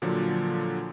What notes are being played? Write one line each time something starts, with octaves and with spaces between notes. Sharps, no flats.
A#2 D3 F3 F#3